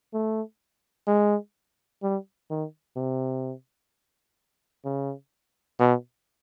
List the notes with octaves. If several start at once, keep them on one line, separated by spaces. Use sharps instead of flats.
A3
G#3
G3
D#3
C3
C#3
B2